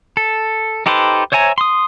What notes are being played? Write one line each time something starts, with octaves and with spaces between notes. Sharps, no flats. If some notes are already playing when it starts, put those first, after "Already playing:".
A4
D#4 G4 A4 B4 C5
C5 C#5 E5 G#5 A#5
C6 D#6